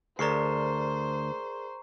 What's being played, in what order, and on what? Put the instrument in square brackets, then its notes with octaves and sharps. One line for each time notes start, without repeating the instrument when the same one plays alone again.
[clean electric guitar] D2 [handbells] G#4 A#4 D5 [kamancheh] C5 [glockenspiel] A#5 C#6 C7